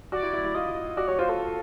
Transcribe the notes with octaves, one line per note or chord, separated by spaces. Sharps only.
F#4 D5
E4
E4
E4
F4 D#5
F#4 D5
F#4 C#5
F4 C5
A4